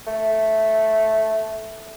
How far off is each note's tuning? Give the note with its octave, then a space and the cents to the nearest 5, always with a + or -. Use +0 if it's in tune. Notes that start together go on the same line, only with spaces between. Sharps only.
A3 -5